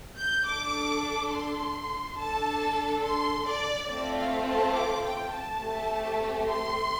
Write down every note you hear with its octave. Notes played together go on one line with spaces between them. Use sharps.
G6
D4 A4 D6
C6
D4 A4 A5
C6
D5
A3 C4 F4 A4 D5
F5
A5
D6
G5
A5
A3 C4 G4
C6